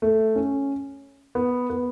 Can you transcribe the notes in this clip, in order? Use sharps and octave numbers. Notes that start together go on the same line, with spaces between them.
A3
C#4
B3
B3